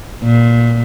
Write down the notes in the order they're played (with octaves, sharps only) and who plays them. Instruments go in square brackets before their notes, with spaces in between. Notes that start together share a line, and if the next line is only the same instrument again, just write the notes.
[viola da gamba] A#2